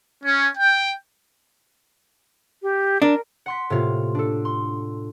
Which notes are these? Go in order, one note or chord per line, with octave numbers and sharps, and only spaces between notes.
C#4
G5
G4
D4 A#4
F#5 C6 B6
A2 C3 A#3 F4
D4 A4
C6